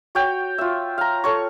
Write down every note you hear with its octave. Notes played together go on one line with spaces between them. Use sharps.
F#4 C#5 G5
F4 E5
F5 A#5
A4 C#5 C#6